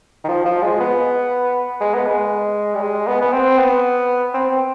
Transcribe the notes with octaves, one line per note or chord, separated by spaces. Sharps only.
D#3
F3
F3
G#3
B3
G#3
B3
G#3
G3
G#3
B3
B3
C4
B3
C4